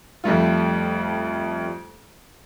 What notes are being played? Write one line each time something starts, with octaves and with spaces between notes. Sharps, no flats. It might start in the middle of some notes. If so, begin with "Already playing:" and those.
F2 G3 A3 F4